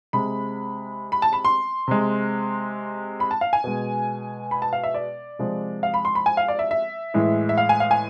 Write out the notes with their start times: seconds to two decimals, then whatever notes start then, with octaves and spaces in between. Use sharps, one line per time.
0.13 C3 G#3 B5
1.12 B5
1.22 A5
1.33 B5
1.45 C6
1.88 C3 G#3
3.20 B5
3.31 A5
3.41 F5
3.53 G#5
3.64 B2 G#3
4.51 B5
4.62 A5
4.73 F5
4.84 E5
4.94 D5
5.39 C3 F3 G#3
5.83 F5
5.94 B5
6.05 C6
6.15 B5
6.26 G#5
6.37 F5
6.48 D5
6.59 E5
6.71 E5
7.14 A2 E3 G#3
7.49 E5
7.58 F5
7.69 G#5
7.80 F5
7.91 G#5